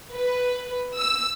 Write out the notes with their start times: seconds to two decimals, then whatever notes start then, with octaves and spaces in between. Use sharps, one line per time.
0.13 B4
0.97 E6